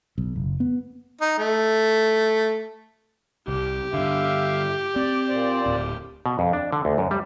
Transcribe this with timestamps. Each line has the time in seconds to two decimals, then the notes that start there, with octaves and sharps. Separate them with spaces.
0.18 B1
0.36 F#1
0.60 B3
1.21 D#4
1.38 A3
3.48 C2 G4
3.94 G2 D3 E5 F5
4.96 C4 D5
5.29 A#2 C5 D5
5.66 D1
6.26 B2
6.39 F2
6.53 D4
6.73 D3
6.85 D2
6.98 F#2
7.11 G3